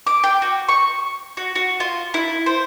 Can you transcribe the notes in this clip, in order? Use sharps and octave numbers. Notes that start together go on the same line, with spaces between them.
D6
G5
F#4
C#6
F#4
F#4
F4
E4
C5